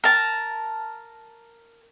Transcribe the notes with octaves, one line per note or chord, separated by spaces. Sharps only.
A#4 A5